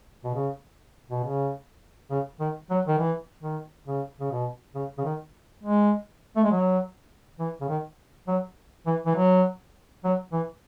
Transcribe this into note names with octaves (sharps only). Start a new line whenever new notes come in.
B2
C#3
B2
C#3
C#3
D#3
F#3
D#3
E3
D#3
C#3
C#3
B2
C#3
C#3
D#3
G#3
A3
G#3
F#3
E3
C#3
D#3
F#3
E3
E3
F#3
F#3
E3